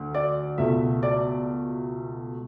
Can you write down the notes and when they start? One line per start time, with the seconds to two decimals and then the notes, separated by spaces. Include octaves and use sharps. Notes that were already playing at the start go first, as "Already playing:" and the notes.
Already playing: D2
0.14 D5
0.58 C#2 B2 A3 E5
1.03 D5